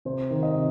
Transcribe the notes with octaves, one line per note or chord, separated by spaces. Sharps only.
C3 C5
D#3
D#5
C3